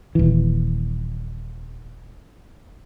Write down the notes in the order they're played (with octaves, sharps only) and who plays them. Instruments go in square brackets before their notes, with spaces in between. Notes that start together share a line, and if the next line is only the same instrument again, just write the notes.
[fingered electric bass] D#1 E3